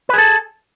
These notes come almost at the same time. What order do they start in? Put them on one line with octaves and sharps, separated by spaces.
B4 G#4 A4